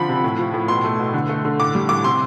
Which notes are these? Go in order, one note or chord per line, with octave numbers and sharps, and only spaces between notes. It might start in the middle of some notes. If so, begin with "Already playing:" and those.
Already playing: D3 F3 C4 B5
C3
A2
F3
A2
B2 C6
A3
B2
D3
A3
D3
A2 D6
G3
A2 D6
C3 C6